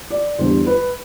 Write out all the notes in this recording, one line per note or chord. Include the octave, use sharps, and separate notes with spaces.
D5
E2 D3 G3 C5
B4